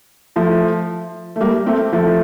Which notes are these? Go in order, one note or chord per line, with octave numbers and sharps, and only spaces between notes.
F3 A3
A3
G3 A#3
A3 C4
F3 A3